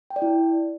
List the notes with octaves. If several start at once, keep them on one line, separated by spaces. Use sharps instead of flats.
G5
D5
E4